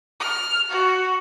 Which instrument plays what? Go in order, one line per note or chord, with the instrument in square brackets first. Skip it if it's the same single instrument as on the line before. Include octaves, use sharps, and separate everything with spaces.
[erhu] F6
F#4